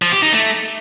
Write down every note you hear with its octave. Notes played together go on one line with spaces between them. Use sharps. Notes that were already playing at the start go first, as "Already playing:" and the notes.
F3
G4
D#4
A3